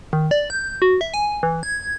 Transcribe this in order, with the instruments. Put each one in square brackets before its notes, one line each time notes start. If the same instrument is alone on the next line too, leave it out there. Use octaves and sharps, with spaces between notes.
[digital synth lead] D#3
D5
G6
F#4
E5
G#5
E3
G#6